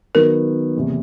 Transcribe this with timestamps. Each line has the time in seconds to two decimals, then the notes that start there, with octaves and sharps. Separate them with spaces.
0.15 D#3 F#3 B3 A#4
0.76 F#1 E2 C3